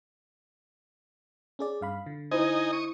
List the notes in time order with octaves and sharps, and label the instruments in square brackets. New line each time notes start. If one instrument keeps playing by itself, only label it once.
[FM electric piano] C#4 G#4 D5
G2 F5 B5
D3
[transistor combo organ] D#4 D#5 G#5 [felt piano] E4 C5
[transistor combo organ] C#6 D#6